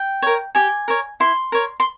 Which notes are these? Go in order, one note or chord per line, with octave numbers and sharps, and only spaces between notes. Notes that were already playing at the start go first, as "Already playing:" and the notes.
Already playing: G5
A#4 C#5
G4 G#5
A#4 C#5
E4 C6
A#4 C#5
C6